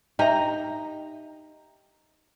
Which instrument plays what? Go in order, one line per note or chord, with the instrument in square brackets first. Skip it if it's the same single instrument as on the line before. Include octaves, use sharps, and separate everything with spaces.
[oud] D#4 [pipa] G4 A#5 [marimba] D#5 E5